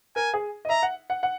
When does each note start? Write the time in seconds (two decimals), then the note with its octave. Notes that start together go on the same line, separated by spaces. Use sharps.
0.16 A#4 G#5
0.34 G#4
0.65 D#5
0.69 E5 A#5
0.83 F#5
1.10 F#5
1.23 F#5